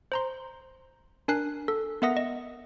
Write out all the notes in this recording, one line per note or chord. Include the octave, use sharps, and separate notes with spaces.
C5 A#5 C6
D4 A#4 G#5 F#6 C7
A4
B3 A#4 E5 F#5 D#6 A#6
D#5